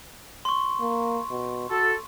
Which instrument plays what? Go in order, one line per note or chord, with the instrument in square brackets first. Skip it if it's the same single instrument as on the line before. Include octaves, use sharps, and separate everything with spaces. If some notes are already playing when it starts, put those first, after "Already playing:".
[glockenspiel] C6 C#6
[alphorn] A#3
B2
[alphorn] F#4 [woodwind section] A4